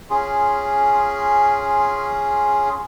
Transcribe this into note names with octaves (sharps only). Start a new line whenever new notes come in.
C#4 F4 G#4